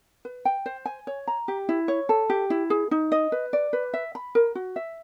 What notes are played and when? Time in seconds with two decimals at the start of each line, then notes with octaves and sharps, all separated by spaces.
0.25 B4
0.45 G5
0.66 C5
0.86 G#5
1.07 C#5
1.28 A#5
1.48 G4
1.69 E4
1.88 C#5
2.09 A4
2.30 G4
2.50 E4
2.70 G#4
2.91 D#4
3.12 D#5
3.32 B4
3.53 D5
3.73 B4
3.94 E5
4.15 B5
4.35 A#4
4.55 F#4
4.76 E5